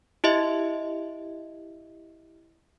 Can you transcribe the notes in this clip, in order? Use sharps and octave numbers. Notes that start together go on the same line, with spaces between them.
E4 G4 D#5 E5